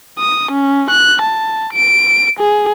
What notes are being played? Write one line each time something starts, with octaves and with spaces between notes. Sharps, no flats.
D#6
C#4
F#6
A5
D7
G#4